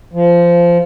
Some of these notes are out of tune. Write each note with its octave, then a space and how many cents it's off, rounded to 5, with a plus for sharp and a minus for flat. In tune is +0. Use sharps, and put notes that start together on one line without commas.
F3 -15